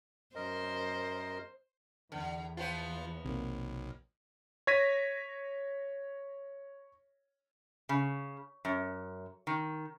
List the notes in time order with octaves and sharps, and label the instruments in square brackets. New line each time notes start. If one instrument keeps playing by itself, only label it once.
[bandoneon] F#2 A#4 D#5 [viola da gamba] C5
[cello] E2 [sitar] D3
[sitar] F3 B3 C5 [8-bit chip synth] F4
[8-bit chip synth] B1 [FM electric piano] C3 A#3
[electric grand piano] C#5 G#6 A#6 B6 D#7
[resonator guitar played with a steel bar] C#3
F#2
D#3